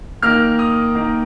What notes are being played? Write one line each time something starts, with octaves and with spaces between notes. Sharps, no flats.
D#3 A#3 F6
D#6
D#3 A#3